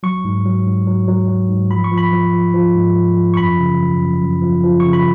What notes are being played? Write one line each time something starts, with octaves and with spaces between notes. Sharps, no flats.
F#3 C#6
G#2
F#3
G#2
F#3
F#3
F#3
G#2
F3 B5
C#6
F3
B5
F3
F3
F3
G#2
F3
F3
C#6
F#2 B5
C#3
F#2
F#2
F#2
F3
F3
C#3 C#6
B5